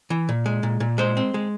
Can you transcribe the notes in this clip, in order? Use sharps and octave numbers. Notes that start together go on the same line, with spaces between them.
E3
A#2
G#3
A#2
A#2
G#3 C5
C4
G#3